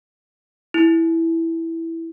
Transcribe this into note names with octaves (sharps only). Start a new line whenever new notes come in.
E4